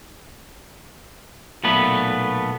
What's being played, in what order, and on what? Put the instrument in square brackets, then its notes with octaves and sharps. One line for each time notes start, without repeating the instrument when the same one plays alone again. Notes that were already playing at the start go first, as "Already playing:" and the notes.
[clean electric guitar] B1 A#2 A3 B3 B4